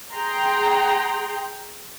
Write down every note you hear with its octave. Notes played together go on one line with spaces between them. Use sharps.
G#4 G5 A#5 C6